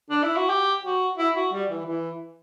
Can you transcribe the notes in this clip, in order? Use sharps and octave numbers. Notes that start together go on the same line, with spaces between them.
D4
E4
F#4
G4
F#4
E4
F#4
G3
E3
E3